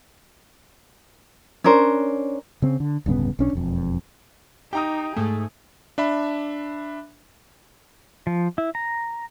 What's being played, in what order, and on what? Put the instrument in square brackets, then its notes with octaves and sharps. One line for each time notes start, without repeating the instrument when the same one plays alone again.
[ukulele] C#4 D4 A#4 C5
[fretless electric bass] C#3 C4
D3
D1 G2 C#3 B3
B1 C#4 D4
E1 F2
[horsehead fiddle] D#4 [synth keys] G4 [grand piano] G5 A#5 D#6
[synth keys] G#2 A3 [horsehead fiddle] G#4
[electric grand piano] D4 E5 B5
[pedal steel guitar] F3
E4
A#5